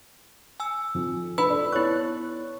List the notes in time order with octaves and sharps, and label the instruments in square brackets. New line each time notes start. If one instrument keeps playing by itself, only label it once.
[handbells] G#5 E6
[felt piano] F2 F3
[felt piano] D4 [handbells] B4 E6 [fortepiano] B5
[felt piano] A4 D5
[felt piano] B3 C#5 F#6 [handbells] E4 C#6